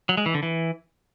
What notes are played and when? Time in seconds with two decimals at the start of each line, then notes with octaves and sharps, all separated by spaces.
0.09 F#3
0.17 G#3
0.26 E3
0.34 D3
0.43 E3